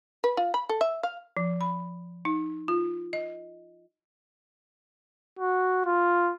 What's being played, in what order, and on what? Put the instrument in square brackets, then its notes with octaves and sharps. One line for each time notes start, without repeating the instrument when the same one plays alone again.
[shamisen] B4
F4
B5
A4
E5
F5
[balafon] F3
B5
D#4
F4
D#5
[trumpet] F#4
F4